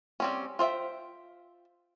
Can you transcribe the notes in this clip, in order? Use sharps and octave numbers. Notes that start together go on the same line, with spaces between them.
G3 C4 C#4
F4 C5 E5 G5